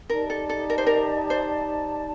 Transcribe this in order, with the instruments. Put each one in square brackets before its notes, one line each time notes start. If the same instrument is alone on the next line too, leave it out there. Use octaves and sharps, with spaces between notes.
[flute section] D#4 G4 D5 A5 [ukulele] A#4
[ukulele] A4
A4
A#4
C5
A#4
C5